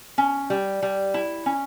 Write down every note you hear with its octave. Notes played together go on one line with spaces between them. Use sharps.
C#4
G3
G3
E4
C#4